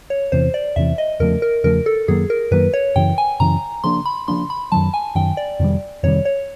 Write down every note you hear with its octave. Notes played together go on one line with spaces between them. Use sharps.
C#5
E2 C3 E3 C5
D5
E2 C3 E3 E5
D#5
E2 C#3 F3 A3 A#4
A#4
E2 C#3 F3 A3 A#4
A4
F#2 D#3 F#3 A#3 G#4
A#4
F#2 D#3 F#3 A#3 B4
C#5
F#2 C#3 E3 G5
G#5
F#2 C#3 E3 A#5
C#3 F3 A#3 D4 C6
B5
C#3 F3 A#3 D4 C6
B5
F#2 D#3 F#3 A5
G#5
F#2 D#3 F#3 G5
D5
F2 C3 D#3 G3
F2 C3 D#3 G3 C#5
C#5